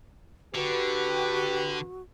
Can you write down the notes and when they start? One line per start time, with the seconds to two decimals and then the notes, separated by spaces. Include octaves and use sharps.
0.55 D3 F#4 G4 B4